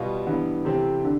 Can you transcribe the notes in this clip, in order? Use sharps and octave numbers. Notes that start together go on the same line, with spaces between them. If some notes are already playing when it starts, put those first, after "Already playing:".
Already playing: B2 G3 B3 F4
G2 E3 B3
C3 E3 A3 C4 G4
D3